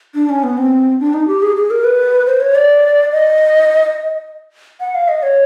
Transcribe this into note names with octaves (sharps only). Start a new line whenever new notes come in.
D4
C#4
B3
C4
D4
D#4
G4
G#4
G#4
A#4
B4
C5
C#5
D5
D#5
F#5
F5
D#5
C#5